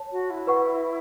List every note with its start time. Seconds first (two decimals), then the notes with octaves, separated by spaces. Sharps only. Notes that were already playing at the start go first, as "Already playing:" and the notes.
Already playing: C#5 A5
0.11 F#4
0.30 E4
0.47 B4 F#5 C#6